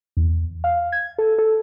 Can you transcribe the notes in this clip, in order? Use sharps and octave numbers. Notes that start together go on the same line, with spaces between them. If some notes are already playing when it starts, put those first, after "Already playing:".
E2
F5
G#6
A4
A4